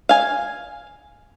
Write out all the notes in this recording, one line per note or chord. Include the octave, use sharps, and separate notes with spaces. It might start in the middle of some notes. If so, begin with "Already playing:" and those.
F5 G#5